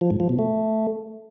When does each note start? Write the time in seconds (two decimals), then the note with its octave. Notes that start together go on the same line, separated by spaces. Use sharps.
0.01 F3
0.11 G#2
0.20 F3
0.29 B2
0.39 A3